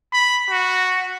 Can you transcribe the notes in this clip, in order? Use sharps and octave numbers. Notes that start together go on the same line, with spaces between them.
B5
F#4